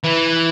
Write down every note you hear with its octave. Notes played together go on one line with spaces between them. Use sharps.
E3